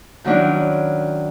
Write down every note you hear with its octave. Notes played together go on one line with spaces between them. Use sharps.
D#3 F#3 C#4 D4 E4